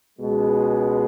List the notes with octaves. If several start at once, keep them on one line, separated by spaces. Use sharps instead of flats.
C#2 B2 G#3